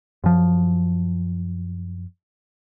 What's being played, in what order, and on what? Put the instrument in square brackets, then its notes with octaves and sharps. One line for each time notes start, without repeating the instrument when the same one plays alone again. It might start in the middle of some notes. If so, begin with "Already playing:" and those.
[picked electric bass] F#2 F3